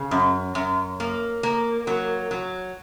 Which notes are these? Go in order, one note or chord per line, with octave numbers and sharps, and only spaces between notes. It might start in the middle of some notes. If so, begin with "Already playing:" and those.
Already playing: C#3
F#2
F#2
A#3
A#3
F#3
F#3